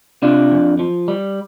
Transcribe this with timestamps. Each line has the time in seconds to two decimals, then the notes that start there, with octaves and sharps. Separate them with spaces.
0.22 C3 D4 F4
0.51 F2
0.79 F3
1.08 G3